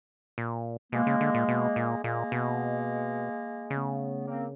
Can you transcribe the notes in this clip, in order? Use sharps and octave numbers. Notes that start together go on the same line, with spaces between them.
A#2
B2 G#3 A#3
C#3
D3
A#2
B2
A#2
A#2 G#3 A#3
B2
C#3 A3 B3
A#3 C4